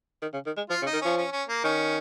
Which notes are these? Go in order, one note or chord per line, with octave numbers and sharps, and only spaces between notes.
D#3
C#3
D#3
G#3
F3 F4
C#3
D#4
D#3
F3 C#4
C#4
C#4
A#3
D#3 C#4